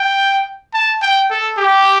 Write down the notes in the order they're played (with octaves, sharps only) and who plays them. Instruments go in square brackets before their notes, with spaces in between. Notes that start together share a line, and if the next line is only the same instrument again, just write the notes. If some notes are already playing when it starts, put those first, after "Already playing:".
Already playing: [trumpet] G5
A5
G5
A4
G4